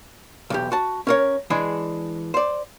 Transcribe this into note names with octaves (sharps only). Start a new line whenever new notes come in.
B1 E2 G4
F#4 A5
C#4 A#4 C#5
E3 G#3 D4 G#4
C5 D5